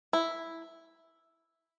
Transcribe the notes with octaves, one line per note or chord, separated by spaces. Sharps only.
E4